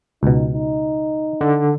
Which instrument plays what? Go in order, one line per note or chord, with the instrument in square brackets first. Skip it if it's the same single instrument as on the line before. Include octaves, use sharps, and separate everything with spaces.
[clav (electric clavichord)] C#2 B2 [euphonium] D#4
[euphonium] D#4
[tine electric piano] D3